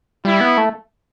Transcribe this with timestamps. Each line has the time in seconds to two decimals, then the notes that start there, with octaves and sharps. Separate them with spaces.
0.25 G3 E4
0.41 B3
0.57 A3